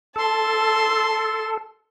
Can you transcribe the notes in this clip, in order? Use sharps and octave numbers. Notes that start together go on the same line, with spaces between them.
A4 A5 C6